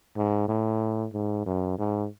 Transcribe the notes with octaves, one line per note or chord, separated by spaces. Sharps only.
G#2
A2
G#2
F#2
G#2